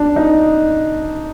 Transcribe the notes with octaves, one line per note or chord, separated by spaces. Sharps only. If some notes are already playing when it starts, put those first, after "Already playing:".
Already playing: D4
D#4